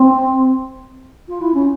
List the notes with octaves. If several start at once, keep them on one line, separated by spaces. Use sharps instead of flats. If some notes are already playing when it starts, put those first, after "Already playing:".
Already playing: C4
F4
E4
C#4